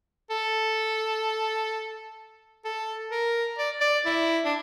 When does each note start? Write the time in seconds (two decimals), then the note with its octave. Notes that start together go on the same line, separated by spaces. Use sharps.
0.30 A4
2.65 A4
3.12 A#4
3.59 D5
3.81 D5
4.06 E4
4.45 D4